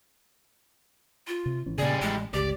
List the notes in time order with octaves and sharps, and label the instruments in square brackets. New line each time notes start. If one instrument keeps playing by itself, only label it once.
[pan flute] F4
[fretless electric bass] C3
G#1 E3 C#4
[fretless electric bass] A#2 C#3 [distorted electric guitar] G3 G#4 [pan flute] D5
[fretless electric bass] A1 [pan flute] G#3
[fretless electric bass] G1 C#2 [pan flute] G4 [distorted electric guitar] D5